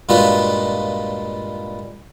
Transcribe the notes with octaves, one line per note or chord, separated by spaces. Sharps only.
G2 A#2 G#3 F4 F#4 B4